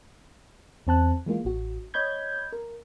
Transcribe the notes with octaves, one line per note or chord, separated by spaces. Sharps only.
E2 C4 A5 F#6
E3 G#3 A#3 F4
A1 F#4
C#5 D#5 B5 G6 G#6
A#4